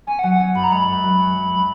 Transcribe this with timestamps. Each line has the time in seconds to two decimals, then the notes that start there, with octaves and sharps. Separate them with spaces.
0.07 C#4 G#5
0.19 F#5
0.23 F#3
0.31 F#5
0.40 C#4
0.55 F#2 B5
0.64 A#5
0.71 G#3 B5
0.87 F#2
1.03 F#3
1.19 C#4
1.36 F#3
1.51 F#3